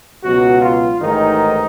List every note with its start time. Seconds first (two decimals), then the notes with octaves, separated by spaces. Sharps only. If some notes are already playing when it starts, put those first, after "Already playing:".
0.24 C#2 B2 F#3 F#4
0.62 F4
1.00 A1 G#2 D#3 G#3 D#4